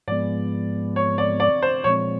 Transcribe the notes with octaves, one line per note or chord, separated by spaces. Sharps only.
G#2 F3 G#3 B3 D5
C#5
D5
D5
C5
A#2 F3 G#3 C4 C#5